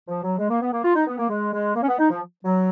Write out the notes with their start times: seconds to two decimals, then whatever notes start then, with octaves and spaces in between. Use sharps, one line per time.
0.08 F3
0.24 F#3
0.39 G#3
0.50 A#3
0.61 B3
0.73 A#3
0.84 F4
0.96 D#4
1.07 B3
1.19 A#3
1.30 G#3
1.53 G#3
1.76 A#3
1.83 C#4
1.88 B3
1.99 D#4
2.11 F3
2.45 F#3